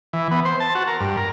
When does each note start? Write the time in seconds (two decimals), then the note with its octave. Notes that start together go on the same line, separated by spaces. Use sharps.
0.13 E3
0.31 B3
0.45 C5
0.60 A5
0.75 F#4
0.87 A#4
1.01 G2
1.17 A#4